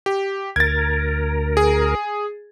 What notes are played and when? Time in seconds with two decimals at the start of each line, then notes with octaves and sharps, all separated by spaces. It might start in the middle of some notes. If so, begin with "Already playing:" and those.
0.06 G4
0.56 D2 A#4 G#6 A6
1.57 G#4